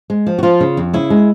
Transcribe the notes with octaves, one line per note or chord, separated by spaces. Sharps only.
G#3
F3
F#4
F3 F4
C#3
F2
C#3 E4
G#3